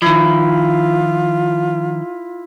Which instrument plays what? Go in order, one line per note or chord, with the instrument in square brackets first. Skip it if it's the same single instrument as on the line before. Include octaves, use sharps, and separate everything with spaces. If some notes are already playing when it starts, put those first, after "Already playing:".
[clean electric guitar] D#3 F3 [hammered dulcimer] E4 [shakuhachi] F4